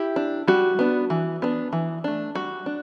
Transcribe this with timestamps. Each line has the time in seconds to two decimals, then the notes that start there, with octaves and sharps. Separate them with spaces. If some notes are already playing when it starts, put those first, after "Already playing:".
Already playing: E4 G4
0.16 D4
0.48 G3 F#4
0.79 B3 D4
1.10 E3
1.42 B3 D4
1.73 E3
2.04 A3 D4
2.35 G3 F#4
2.66 D4